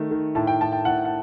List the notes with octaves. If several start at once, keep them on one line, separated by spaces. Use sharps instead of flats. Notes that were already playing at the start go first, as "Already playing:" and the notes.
Already playing: D#3 A3
D#3
A2 A5
G5
A2 A5
G5
A2 F#5
F#5